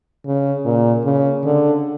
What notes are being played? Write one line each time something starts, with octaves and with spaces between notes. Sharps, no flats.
C#3
A#2
C#3
D3